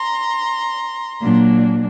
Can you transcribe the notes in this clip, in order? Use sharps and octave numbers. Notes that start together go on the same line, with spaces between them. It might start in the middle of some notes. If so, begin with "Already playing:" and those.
Already playing: A#5 C6
A#2 F#3 A#3 D4